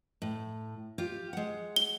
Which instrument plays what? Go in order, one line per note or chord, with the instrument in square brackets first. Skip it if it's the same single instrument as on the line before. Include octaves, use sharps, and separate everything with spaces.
[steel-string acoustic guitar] A2
F4 G4
G#3 F#5
[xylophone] G7